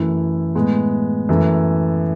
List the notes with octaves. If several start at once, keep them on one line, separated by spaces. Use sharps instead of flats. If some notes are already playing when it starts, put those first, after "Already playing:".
Already playing: F#2 E3 A3 E4 A4
A2 G#3 B3
F#2 E3 A3